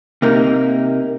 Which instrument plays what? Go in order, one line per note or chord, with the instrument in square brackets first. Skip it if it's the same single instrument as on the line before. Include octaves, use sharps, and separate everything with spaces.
[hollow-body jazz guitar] C3 A#3 D#4